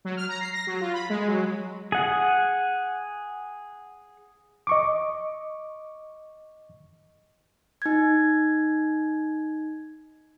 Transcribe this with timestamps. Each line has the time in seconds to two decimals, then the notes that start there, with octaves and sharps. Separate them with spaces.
0.05 F#3
0.17 F6
0.29 A#5
0.41 C7
0.53 A#6
0.67 F#3
0.81 F4
0.94 B5
1.10 G#3
1.28 F#3
1.92 G#4 F#5
4.67 D#5 C#6 D6
7.82 D#4 G#6